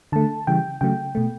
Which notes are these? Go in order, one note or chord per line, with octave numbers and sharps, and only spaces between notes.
D3 A3 A5
C#3 E3 G3 G5
C#3 F#3 A3 G5
B2 A3